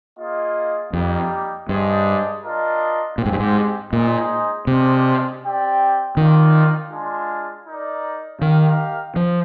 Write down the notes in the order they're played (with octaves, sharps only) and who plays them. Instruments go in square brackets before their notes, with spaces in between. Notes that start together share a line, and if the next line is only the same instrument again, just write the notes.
[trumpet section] A#3 F4 G#4 D#5
[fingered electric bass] F2 [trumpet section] G3 A#3 D#4 G4
[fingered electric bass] G2 [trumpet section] D4 G#4 C5 D#5
[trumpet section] D4 F4 A#4 D#5
[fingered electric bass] A#2 [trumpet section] G#3 C4 G4
[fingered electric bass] G#2
G2
G#2
[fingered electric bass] A#2 [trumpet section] G#3 D#4 G#4 C5 D#5
[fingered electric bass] C3 [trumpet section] G#3 D4 F4 C5 D#5
[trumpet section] C4 G4 D5 G5
[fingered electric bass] D#3 [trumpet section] C4 F4 A#4 D5 F5
[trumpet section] G#3 D4 F4
D#4 A#4 D5
[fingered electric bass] D#3 [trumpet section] D#4 G4 A#4 F5
[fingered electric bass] F3